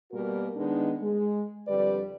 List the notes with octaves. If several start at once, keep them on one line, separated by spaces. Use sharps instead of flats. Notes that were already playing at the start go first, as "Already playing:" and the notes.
B2 G3 A#3 F#4 A#4
D#3 G#3 B3 D4 D#4
G#3
F2 D3 G3 B4 D5